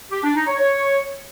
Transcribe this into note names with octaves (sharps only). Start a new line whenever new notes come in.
G4
D4
D#4
C#5
C#5